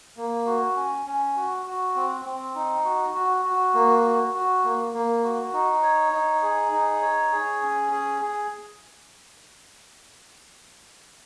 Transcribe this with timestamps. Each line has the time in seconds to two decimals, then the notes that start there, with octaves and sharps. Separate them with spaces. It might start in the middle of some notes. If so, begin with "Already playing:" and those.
0.17 A#3
0.46 F#4
0.76 C#4
1.06 C#4
1.36 F#4
1.66 F#4
1.96 C4
2.25 C4
2.55 D#4
2.85 F#4
3.15 F#4
3.45 F#4
3.74 A#3
4.04 F#4
4.34 F#4
4.64 A#3
4.94 A#3
5.24 F#4
5.53 D#4
5.83 C#5
6.13 D#4
6.43 G#4
6.72 D#4
7.02 C#5
7.32 G#4
7.62 C#4
7.92 G#4
8.21 G#4